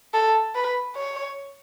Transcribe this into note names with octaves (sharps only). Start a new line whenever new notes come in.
A4
B4
C#5